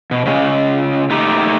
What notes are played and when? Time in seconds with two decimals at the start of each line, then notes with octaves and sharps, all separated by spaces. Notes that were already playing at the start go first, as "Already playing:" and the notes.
0.11 B2
0.26 C#3 G#3
1.10 A3 D#4 G4